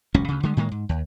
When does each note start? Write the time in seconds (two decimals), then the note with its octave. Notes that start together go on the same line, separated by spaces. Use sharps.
0.14 E1 C#2 F#3 C#4
0.28 D2 C#3
0.43 D3 G3 G#3
0.57 A2 D#3 G#3 A#3
0.72 G#2
0.89 D#2